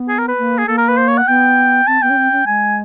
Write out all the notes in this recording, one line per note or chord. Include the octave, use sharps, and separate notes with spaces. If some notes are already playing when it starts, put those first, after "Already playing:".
Already playing: B3
G#4
A#4
B4
A#3
G#4
A#3 A4
A#4
B4
C5
C#5
F#5
B3 G5
C4 A5
B3 G5
C#4
C4
C#4
G#3 G#5